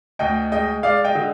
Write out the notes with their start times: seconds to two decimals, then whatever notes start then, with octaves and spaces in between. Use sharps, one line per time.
0.19 D2 D#5 G5
0.52 G#3 D#5 G5
0.83 G#3 D5 F5
1.04 D#5 G5
1.15 D3